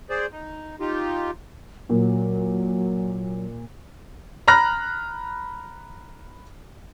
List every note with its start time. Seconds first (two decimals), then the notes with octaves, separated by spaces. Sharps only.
0.10 G#4 C5 D5
0.32 D#4
0.80 D#4 F4 G4
1.89 A#2 F#3
4.48 A#5 B5 F6 F#6 A#6